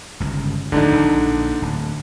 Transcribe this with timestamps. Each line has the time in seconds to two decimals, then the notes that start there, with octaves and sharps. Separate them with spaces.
0.20 G1 C#2
0.72 D1 G#1 D3 F3 D4 D#4
0.96 A#1
1.62 D1